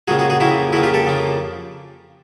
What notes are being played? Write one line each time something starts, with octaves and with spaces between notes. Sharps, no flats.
F2 C#3 F3 A#3 F#4 G#4
F#4 G#4
F#4 G#4
F2 C#3 F3 A#3 E4 F#4
F2 C#3 F3 A#3 E4 F#4
F4 G4
G4 A4
F2 C#3 F3 A#3